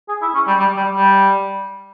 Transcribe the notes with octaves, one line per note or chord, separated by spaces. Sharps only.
G#4
E4
C#4
G3
G3
G3
G3